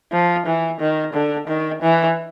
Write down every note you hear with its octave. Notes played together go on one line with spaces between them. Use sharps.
F3
E3
D#3
D3
D#3
E3